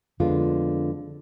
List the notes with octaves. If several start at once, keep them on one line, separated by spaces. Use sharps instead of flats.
F2 D3 G#3 B3 F4